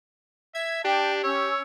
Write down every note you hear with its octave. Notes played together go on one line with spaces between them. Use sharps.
E5 G#6
D4 G4 G5 A5 G6
C#4 C#5 E6